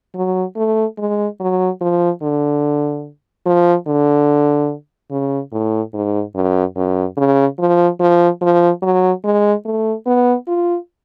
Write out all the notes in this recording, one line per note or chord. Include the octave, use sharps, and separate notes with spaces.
F#3
A3
G#3
F#3
F3
D3
F3
D3
C#3
A2
G#2
F#2
F#2
C#3
F3
F3
F3
F#3
G#3
A3
B3
F4